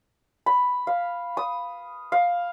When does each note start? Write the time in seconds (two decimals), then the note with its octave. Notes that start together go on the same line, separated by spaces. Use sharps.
0.46 B5
0.87 F5
1.37 D#6
2.12 F5